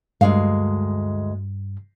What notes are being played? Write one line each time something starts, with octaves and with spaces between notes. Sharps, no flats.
D2 G2 G#3 F5